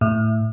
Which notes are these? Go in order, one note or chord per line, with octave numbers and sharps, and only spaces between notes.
A2